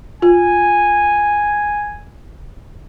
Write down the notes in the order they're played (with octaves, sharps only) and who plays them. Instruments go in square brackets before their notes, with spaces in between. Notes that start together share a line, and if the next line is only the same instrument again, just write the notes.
[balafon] F4 [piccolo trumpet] G#5